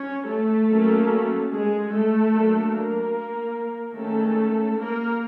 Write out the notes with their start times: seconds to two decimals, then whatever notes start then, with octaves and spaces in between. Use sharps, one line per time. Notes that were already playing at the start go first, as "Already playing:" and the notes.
Already playing: C#4 C#5
0.30 A3 A4
0.71 F#3 A#3 C#4
1.52 G#3 G#4
1.92 A3 A4
2.33 F#3 A#3 D4
2.73 A#3 A#4
3.95 D#3 G#3 A3 C#4 A4
4.76 A#3 A#4